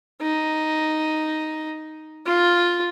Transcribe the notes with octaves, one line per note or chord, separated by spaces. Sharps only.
D#4
F4